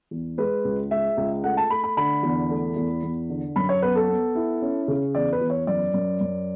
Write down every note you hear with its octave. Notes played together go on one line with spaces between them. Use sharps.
E2
G#3 B4
C#2
G#3 E5
C#2
A3 F#5
A5
A3 B5
B5
D3 B5
E2
A3
E2
E2
D3
F#2 B5
C#5
B3 B4
A4
B3
E4
C#4
C#3
E2 D5
B4
E2
C#5
F#2 D5
F#2
F#2